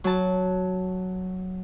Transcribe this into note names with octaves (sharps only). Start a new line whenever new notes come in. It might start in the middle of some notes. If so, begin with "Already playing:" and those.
F#3 A5